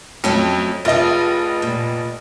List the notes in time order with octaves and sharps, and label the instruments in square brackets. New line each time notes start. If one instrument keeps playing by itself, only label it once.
[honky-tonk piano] F2 [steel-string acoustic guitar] F#3 A3 C#4
[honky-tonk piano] F1 D#5 [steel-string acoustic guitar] F4 G#4
[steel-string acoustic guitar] A#2